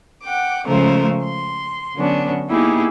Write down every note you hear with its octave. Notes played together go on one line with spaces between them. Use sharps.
F#5 G5 D6
C#3 F3 G#3 A3 A#4 C5
C6
D3 F#3 B3 C#4 D4
A#3 B3 D#4 E4 G4 G#4